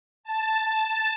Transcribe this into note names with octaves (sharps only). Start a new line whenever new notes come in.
A5